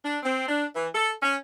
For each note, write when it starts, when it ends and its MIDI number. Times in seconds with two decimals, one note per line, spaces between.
0.03 0.17 62
0.23 0.47 60
0.48 0.65 62
0.74 0.86 52
0.93 1.10 69
1.21 1.35 61